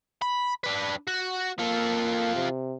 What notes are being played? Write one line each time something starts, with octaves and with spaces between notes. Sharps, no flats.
B5
D4 B4
F#4
A#3 F4 A4
C3